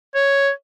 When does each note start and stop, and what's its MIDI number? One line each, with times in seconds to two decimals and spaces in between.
0.15 0.50 73